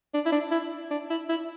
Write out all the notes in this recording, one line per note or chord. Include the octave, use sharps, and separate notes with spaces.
D4
E4
D4
E4
D4
E4
E4